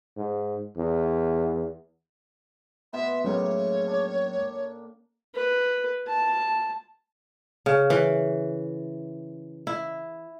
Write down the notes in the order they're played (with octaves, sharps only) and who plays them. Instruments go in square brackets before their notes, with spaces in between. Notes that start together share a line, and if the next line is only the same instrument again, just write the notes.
[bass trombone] G#2
E2
[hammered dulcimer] B2 B3 C6 [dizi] E5
[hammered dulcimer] A2 C#3 A#3 [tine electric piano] F#3 G#3 C#4 [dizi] C#5
[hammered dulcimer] D4
[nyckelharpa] B4
A5
[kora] C#3
E3
E4